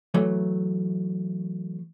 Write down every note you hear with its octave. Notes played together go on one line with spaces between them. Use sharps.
E3 F#3 A3